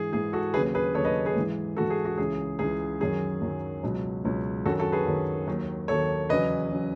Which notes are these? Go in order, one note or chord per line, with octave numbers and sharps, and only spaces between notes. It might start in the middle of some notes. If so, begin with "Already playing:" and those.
Already playing: G#2 E3 G#4
G#2 E3 G#4
F#4 A4
D#2 C#3 F#3 G#4 B4
G#4 B4
D#2 C#3 F#3 A4 C#5
B4 D#5
G#4 B4
G#2 E3
G#2 E3 F#4 A4
G#4
F#4
C#2 C#3 E3 G#4
C#2 C#3 E3 G#4
F#2 D#3 F#3 G#4
F#2 D#3 F#3
C#2 B2 F#3
C#2 B2 F#3
F#2 D#3 F#3 F#4 A4
F#4 A4
G#4 B4
F#2 D#3 F#3
D#2 D#3 F#3
D#2 D#3 F#3 A4 C#5
E2 C#3 F#3 B4 D#5
C#3 F#3